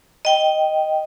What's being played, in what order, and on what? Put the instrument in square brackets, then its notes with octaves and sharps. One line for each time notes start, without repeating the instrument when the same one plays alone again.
[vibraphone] D#5 G5